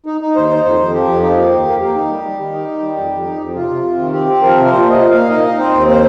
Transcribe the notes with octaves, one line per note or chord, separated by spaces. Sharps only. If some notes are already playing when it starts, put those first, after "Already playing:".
D#4
D#4
D#2 C5
D#4
F2 C5
F2
F3 G4
F2
D#4 G4
A#3
D#2
A#3
A#3 G4
D#4
G3
G3
D#3
D#4
D#3
G3
F2
F2
D#4
F2
C3 F4
C3
C3
D#3
C4 G4
C4
F3 A#4
C3
A#4
A#2 C5
A#3 D#5
A#2
A#3 F5
D#4 D#5
D#4
C4 C5
D#2
A#3 C5